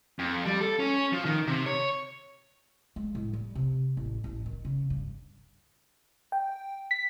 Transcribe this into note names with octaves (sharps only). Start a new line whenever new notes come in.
F2
G3
A4
C#4
F3
D#3
C3
C#5
G#3
A2
G3
C3
A1
A1
D#3
C#3
G2
G5
B6